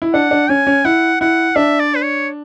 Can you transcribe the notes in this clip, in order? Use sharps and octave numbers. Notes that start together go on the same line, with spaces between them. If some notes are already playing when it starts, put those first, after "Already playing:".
E4
D4 F#5
D4
C#4 G#5
C#4
E4 F#5
E4 F#5
D4 E5
D5
B4
C#5